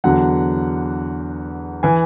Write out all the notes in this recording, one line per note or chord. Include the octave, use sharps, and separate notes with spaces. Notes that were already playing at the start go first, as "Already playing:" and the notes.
E2 D3 F#3 F#5
E3 G#5